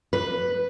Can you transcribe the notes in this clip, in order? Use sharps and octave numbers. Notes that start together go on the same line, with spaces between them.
B4